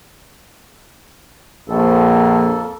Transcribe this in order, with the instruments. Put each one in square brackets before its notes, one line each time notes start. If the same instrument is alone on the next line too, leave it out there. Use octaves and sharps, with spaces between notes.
[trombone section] A#1 [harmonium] F2 A#3 A4